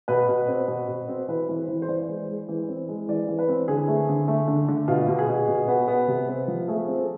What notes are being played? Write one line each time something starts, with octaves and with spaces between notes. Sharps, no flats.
B2 B4
B2
C4
B2
B2
C4
E3 B4
E3
C5
E3
C5
E3 D5
G#3
G#3
E3
C4
G#3
E3 D5
E3
B4
C4
D3 G#4
A3
D3
A3
D3
D3
B2 F4
B2
G#4
B2
B2
B3
B3
C3
C4
F3
A3 G#4
C4
A4